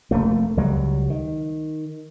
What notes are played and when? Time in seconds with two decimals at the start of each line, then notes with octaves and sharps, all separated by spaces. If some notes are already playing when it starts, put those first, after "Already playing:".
0.11 F1 A3 A#3
0.57 C#2 F#3 G3
1.10 D#3